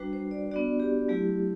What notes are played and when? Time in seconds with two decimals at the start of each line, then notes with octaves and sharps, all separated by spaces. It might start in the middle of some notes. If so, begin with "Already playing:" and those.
Already playing: G3 D4 F#4 B4
0.13 C5
0.31 D5
0.51 B3 D4 F#4 D5
0.80 G4
1.08 F#3 A3 E4 G4